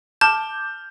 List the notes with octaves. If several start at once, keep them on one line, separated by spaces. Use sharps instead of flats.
A5 D6 F6 G6